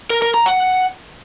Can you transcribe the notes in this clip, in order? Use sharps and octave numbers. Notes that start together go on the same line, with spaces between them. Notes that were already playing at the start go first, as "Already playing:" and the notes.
A#4
A#4
A#5
F#5